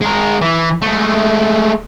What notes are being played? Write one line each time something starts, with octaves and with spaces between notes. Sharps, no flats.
G#3 A#4
E3
G#3 A3